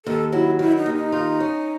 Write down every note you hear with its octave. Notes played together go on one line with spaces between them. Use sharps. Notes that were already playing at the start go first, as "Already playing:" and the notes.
D#2 A4
F#3 E4
D#3 E4
D#4
D#2
D#4
F4
C#4